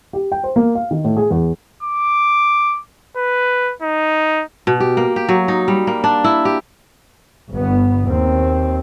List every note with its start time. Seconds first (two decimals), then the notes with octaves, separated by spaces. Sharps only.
0.13 G4
0.32 G5
0.44 C5
0.56 A#3
0.75 F5
0.91 D#3
1.04 A2
1.17 G#4
1.31 E2
1.83 D6
3.17 B4
3.83 D#4
4.67 B2
4.80 G4
4.97 A#3
5.16 G4
5.29 F#3
5.48 D#4
5.68 G3
5.87 A#3
6.04 D4
6.24 E4
6.45 G4
7.53 G1 B3
8.05 D#2 C4